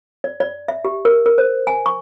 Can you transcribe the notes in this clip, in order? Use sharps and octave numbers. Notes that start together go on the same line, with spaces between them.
D5
D5
E5
G4
A#4
A#4
C5
G#5
C#6